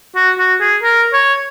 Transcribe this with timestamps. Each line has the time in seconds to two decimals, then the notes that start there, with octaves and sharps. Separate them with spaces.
0.16 F#4
0.38 F#4
0.60 G#4
0.83 A#4
1.13 C#5